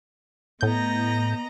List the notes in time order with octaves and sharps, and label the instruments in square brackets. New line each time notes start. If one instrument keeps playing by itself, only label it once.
[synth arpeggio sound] A2 G6 [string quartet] B3 D#5 A#5